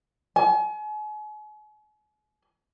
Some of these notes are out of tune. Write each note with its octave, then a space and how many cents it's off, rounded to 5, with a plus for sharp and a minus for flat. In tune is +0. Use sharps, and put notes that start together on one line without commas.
G#5 +40